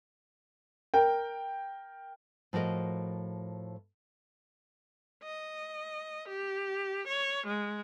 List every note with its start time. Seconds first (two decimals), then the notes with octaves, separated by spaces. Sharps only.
0.94 A#4 G5
2.53 A2 F3 F#4 A#4 D#5
5.23 D#5
6.28 G4
7.07 C#5
7.47 G#3